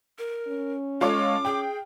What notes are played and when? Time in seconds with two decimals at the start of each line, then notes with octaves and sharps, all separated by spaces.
0.18 A#4
0.47 C#4
1.01 G#3 F4 A4 C#5 D6
1.45 G#4 G5